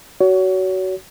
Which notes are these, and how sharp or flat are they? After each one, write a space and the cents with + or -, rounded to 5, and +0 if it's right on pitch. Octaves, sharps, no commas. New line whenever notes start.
F#4 +20 C#5 +30